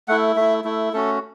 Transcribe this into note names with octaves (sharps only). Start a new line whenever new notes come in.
A3 E4 F#5
A3 E4 E5
A3 E4
A3 C#4 F#4 A4